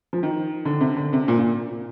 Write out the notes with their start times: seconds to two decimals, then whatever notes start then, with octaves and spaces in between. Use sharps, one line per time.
0.13 F3
0.23 D#3
0.65 D3
0.81 C3
0.96 D3
1.13 C3
1.28 A#2
1.39 A#2